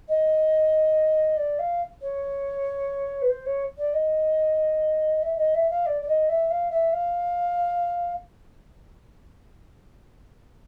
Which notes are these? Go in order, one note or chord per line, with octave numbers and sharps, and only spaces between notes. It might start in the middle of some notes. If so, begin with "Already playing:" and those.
D#5
D5
F5
C#5
B4
C5
C#5
D5
D#5
E5
D#5
E5
F5
D5
D5
D#5
E5
F5
E5
F5